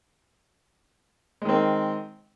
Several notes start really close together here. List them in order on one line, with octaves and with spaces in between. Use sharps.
G#3 D#3 C4